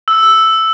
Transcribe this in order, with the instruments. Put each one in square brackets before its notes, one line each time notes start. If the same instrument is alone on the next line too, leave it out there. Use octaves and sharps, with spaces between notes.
[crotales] E6